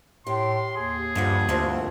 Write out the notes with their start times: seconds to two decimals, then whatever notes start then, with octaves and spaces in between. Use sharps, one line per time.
0.27 A2 G4 C6
0.76 D#2 G#4
1.15 G2 D3 F3 F#5
1.49 D2 F3 A#3 C4